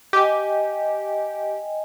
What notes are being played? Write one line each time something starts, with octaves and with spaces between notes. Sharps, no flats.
G4 D#5 G5 G#5